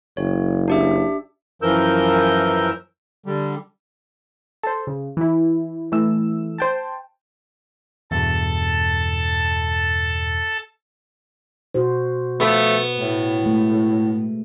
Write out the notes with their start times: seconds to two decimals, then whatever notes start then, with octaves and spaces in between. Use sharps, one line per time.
0.17 F#1 C#5
0.68 D4 G4 E5
1.62 F#2 E3 F3 A#4 E6 G6
3.26 D3 G3
4.63 A4 C5
4.87 C#3
5.17 E3 E4
5.92 E3 A3 E6
6.58 C5 G5 A5
8.11 E2 G2 B2 A4 A5
11.74 B2 F#4 C5
12.40 F3 A3 B3
12.99 A2
13.43 G#3 A3